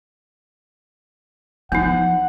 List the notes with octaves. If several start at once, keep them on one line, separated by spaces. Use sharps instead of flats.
F3 B3 D#4 F#5